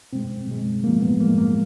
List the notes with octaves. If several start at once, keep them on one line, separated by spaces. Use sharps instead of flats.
B2 G#3 C4
B2 G#3
A2 F3 G#3 A#3
B3
A2 F3 G#3 A#3
A#3